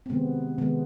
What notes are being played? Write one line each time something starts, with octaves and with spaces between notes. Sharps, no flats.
C4
C3 D#3 G#3 B3
C3 D#3 G#3 B3